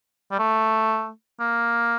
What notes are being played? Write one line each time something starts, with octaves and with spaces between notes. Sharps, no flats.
G3
A3
A#3